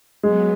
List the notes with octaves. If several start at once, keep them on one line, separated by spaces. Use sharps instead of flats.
F#3 G#3 B3